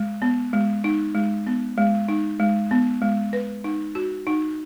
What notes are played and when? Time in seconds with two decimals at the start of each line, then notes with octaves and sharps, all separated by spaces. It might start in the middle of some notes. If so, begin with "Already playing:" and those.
Already playing: G#3
0.22 B3
0.53 G#3
0.84 D#4
1.15 G#3
1.47 B3
1.78 G#3
2.09 D#4
2.40 G#3
2.71 B3
3.02 G#3
3.33 B4
3.64 D#4
3.95 F#4
4.27 D#4